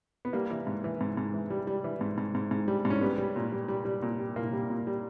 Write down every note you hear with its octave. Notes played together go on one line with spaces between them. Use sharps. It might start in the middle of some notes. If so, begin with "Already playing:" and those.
B3
G3 A#3
E3
G#2
E3
G#2
G#2
E3
G3
G3
E3
G#2
G#2
G#2
G#2
G3
G#2
C#4
G3 B3
G3
A#2
G3
G3
G3
A#2
G3
A#2 A#3
G3
A#2
G3